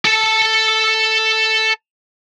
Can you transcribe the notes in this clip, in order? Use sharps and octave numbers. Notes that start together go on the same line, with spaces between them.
A4 A5